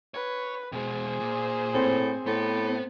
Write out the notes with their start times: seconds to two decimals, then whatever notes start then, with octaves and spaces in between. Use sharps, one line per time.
0.14 B4 C#5
0.72 B2 G#3 G#4 C5
1.20 A#2
1.74 A2 C4
2.26 A2 B3